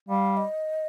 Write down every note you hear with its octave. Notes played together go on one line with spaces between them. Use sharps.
G3 F5
D#5